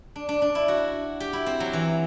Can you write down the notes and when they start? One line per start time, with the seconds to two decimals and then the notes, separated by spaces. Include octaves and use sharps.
0.16 D4
0.29 D4
0.42 D4
0.55 E4
0.68 F#4
1.20 G4
1.33 E4
1.46 C4
1.60 F#3
1.73 E3